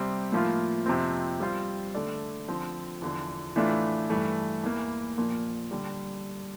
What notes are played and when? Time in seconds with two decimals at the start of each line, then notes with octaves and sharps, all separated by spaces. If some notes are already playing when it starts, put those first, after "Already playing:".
Already playing: C3 G3 C4 G4
0.32 A2 F3 A#3 F4
0.86 F2 C3 F3 C4
1.40 G3 C4 F4 C5
1.94 D3 A3 D4 A4 D5
2.48 D3 F3 C4
3.02 E2 D3 F3
3.56 A2 E3 A3 D4 F4
4.10 G2 E3 A3
4.63 E2 E3 A#3
5.17 A#2 F3 A#3
5.71 D3 G3